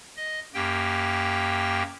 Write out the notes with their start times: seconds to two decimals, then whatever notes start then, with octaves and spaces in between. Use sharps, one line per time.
0.17 D#5
0.54 F#2 A#3 G4 G5